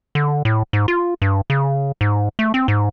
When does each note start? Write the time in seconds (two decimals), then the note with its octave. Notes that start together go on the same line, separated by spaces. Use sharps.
0.15 D3
0.45 A2
0.73 G#2
0.88 F4
1.22 G2
1.50 C#3
2.01 G#2
2.39 A3
2.54 C4
2.68 G#2